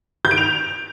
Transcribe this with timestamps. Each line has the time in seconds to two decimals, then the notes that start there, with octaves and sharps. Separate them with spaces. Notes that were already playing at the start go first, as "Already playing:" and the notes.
0.25 G6
0.31 D7
0.37 F7